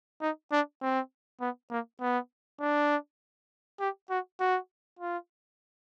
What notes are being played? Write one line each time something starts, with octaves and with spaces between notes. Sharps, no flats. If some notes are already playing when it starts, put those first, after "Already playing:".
D#4
D4
C4
B3
A#3
B3
D4
G4
F#4
F#4
F4